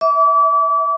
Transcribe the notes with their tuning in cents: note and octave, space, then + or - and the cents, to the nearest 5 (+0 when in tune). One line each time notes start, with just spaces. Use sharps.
E5 -25 D6 -35